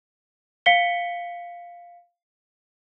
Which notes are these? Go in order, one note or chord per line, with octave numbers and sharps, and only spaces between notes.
F5 B6 C#7 G7